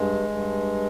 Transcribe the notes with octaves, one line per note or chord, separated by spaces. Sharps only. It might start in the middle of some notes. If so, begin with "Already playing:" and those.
Already playing: G2 G#3
G2